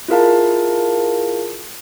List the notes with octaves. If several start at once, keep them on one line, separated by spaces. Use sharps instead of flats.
E4 F4 G#4 A#4 F5 A5